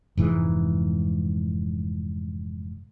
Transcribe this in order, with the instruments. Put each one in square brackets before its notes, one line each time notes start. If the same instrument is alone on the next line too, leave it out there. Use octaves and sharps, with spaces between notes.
[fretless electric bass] F1 G#2 E3 G#3